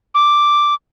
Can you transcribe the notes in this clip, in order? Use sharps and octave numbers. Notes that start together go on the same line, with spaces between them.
D6